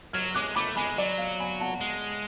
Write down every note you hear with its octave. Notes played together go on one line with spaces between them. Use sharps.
F#3 F6 G#6
G#3 D6 F#6
A3 B5 D6
G#3 G#5 B5
F#3 D5
F5
G#5 B5
F#5 A5
G#3